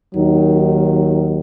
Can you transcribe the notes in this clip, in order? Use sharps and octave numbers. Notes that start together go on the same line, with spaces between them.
D#2 D#3 F#3 D#4